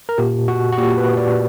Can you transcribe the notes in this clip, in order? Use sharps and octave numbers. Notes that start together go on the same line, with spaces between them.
A#4
A#2 G4
F#4
F#4
A#2 G4
B4
D5